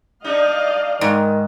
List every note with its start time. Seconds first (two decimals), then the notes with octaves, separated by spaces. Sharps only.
0.24 G3 D4 D#4 D5 D#5 F5
1.01 G#2 D#3